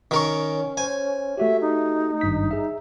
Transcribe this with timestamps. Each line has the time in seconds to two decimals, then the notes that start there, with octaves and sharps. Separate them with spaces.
0.11 D#3 C#4 A#4 C#6
0.77 C5 C#5 G#5
1.38 A3 F#4 G4 E5
1.61 D#4
2.21 G#1 G2 B6
2.51 G#4 E5